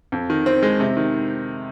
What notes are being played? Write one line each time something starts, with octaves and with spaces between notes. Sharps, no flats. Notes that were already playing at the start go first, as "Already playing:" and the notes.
F2
D#3
C4
G#3
C3
D#3